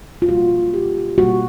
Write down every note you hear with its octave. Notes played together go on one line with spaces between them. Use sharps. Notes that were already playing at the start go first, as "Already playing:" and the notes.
F4
B2 G3 A#3 F#4
G4
B2 G3 A#3 F#4